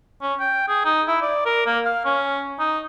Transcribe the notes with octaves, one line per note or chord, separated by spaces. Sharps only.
C#4
G5
G#4
D#4
E4
D5
A#4
A#3
F5
C#4
D#4